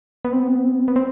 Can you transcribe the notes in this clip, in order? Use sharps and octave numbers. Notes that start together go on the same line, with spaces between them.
B3
C4
B3
C4
B3
C4
B3
C4
B3
C4